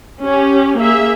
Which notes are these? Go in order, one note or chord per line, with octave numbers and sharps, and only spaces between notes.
C#4 G4
A#3 G#4 E5